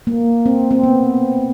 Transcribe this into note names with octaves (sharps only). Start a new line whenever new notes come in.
A#3
C4
C4
B3